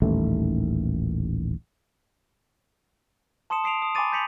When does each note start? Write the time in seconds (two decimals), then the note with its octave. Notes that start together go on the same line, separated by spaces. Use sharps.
0.02 D#1 A1 D#2 A3
3.50 A5 C6 D#6 C#7 E7
3.64 D#6 C7 D7 F7
3.82 D#6
3.95 G#5 B5 C6 D6 A6 D#7
4.12 G6 A6 B6 C#7 F7 F#7